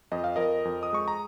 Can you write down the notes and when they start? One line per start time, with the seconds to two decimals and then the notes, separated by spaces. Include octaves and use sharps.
0.12 F2 D#5
0.24 F5
0.36 F2 A#4 D#5
0.65 F2
0.83 D#6
0.93 G#3 C#6
1.08 A#5